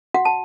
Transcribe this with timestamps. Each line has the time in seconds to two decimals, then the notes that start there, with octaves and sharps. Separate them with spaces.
0.14 F#4 F#5
0.25 A5